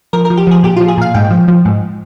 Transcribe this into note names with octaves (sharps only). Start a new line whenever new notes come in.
F3 A#4
A#4
F3
G4
F3 G#4
A#2 G4
F3 F4
G#4
A#2 F5
G#2 G5
F3
F3
G#2